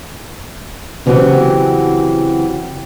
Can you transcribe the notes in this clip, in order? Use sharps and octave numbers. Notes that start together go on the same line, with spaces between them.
C#3 E3 F#3 C4 F#4 G4